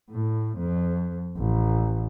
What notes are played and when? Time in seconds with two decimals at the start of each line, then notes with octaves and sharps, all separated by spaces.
0.11 A2
0.58 F2
1.36 A1